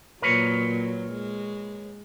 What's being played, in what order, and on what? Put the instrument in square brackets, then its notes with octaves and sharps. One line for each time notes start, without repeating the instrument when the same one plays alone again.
[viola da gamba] A#2 F#3 [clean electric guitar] A#4 B4 C#5
[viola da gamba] G#3